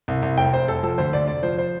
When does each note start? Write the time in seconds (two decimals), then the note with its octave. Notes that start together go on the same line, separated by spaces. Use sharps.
0.08 C2
0.22 C2
0.38 F1 G5
0.52 F1 C5
0.68 F1 A4
0.83 F3 A4
0.98 D2 C5
1.13 D2 D5
1.28 F1 D5
1.43 F3 C5
1.58 C5